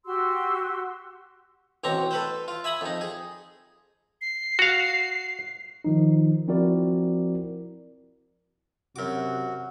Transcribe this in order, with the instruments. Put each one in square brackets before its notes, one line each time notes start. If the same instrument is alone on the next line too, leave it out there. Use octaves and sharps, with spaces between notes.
[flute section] F#4 G4 C6 E6
[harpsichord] A1 B2 C4 A#5 C#6
A4 B4 C5
F4
E5 G#5 B5 D#6
F2 D#4
G#4
[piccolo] C7
[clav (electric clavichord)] F#4 F5
[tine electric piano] D#3 F3 D#4
F3 C4 E4 F#4 A#4 D5
[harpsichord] F#2 D6 [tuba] C3 [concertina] F#4